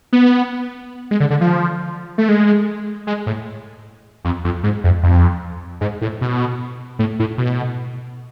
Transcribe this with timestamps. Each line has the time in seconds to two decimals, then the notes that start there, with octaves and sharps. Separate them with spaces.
0.13 B3
1.11 G#3
1.20 D3
1.30 D3
1.41 F3
2.18 A3
2.29 G#3
3.07 G#3
3.27 A2
4.25 F2
4.44 F2
4.63 G#2
4.84 F2
5.03 F2
5.81 G#2
6.01 A2
6.21 B2
6.99 A2
7.19 A2
7.38 B2